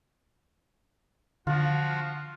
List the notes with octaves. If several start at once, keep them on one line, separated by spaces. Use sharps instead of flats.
D3 F3 F4 F#4